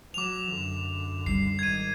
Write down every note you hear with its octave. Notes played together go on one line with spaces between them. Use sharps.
F#3 D6 F7
F#2 D3
G3 C7
G#1 D#3 G#6 D#7